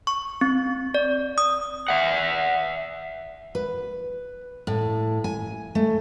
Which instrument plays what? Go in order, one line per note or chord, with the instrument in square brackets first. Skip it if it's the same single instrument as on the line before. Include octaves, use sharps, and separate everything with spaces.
[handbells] C#6
C4
D5
D#6
[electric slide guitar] E5 F#5
[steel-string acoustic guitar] B4
A2
G#5
A3